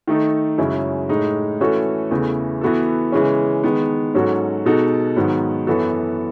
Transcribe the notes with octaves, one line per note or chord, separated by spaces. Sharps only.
D#3 A3 D#4 A4
F#2 C#3 G#3 C#4 E4
A2 G#3 D#4
E3 A3 C#4 F#4 A4
E2 C#3 E3 A3
E3 B3 F#4 A4
C#3 E3 G#3 C#4
D#3 G#3 B3
G#2 F#3 C#4 F#4 A4
B2 G#3 D#4 F#4 A4
G#2 D#3 F#3 B3
F#2 E3 B3 F#4 A4